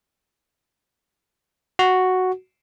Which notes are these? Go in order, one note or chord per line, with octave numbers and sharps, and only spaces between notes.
F#4